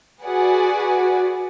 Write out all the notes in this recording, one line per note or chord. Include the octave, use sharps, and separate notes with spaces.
F#4 G#4 B4 D5 F#5